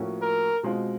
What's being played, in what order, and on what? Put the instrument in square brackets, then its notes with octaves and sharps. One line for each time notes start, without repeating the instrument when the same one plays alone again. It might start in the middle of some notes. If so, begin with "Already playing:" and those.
Already playing: [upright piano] A2 F3 A#3 C#4 F#4
[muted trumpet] A#4
[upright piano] B2 G#3 C4 F4